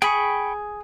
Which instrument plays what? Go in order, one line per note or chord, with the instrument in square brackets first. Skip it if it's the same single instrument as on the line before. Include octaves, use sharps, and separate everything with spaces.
[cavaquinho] G#4 [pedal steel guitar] G5 B5 C#6